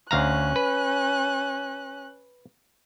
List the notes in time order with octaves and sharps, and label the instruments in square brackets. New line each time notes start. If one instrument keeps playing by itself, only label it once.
[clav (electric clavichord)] D2 F5 A#5 [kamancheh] C#4 F#6
[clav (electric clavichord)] B4